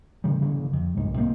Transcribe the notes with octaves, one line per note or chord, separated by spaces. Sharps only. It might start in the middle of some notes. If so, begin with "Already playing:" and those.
C#3 E3 G3
C#3 E3 F#3 A#3
F2
C2 G#2
C3 A#3 C4